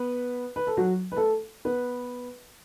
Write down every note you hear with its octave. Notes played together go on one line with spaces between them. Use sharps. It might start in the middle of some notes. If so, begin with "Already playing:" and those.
Already playing: B3 B4
B4
A4
F#3 F#4
B4
A3 A4
B3 B4